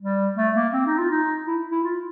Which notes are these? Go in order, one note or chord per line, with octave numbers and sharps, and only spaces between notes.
G3
A3
A#3
C4
D#4
F4
D#4
E4
E4
F4